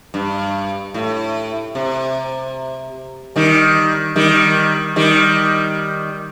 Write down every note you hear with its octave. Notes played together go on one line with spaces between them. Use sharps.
G2
A2
C3
D#3 G3
D#3 G3
D#3 G3